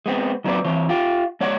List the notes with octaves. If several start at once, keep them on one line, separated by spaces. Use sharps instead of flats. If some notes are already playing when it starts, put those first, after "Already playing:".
G#3 B3 C4
D#3 F#3 C4 B4 D5
E3 C4 C#5
F4 G4
G#3 C#5 D5 F#5